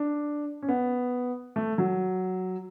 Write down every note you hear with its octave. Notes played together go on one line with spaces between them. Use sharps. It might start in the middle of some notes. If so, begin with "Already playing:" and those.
Already playing: D4
C#4
B3
A3
F#3